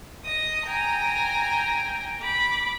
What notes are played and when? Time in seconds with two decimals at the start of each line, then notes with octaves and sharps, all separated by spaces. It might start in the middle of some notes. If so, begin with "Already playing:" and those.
0.25 D#5 D#6
0.65 G5 G#5 A#5
2.22 B5 D6